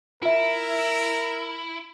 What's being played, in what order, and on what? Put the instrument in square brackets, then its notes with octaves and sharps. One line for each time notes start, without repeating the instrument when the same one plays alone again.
[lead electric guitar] E4 [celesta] F4 E5 [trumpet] A#4